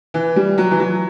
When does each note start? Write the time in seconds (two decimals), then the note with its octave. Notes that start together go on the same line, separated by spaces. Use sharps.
0.14 E3
0.36 G3
0.58 F#3
0.71 E3
0.80 F#3